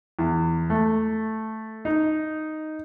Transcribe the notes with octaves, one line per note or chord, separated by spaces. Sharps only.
E2
A3
D#4